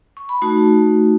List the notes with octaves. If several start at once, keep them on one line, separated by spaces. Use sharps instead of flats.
C#6
B5
A3 D#4 F#4 A5